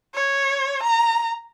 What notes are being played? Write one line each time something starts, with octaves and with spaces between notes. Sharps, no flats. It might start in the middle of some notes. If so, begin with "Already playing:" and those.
C#5
A#5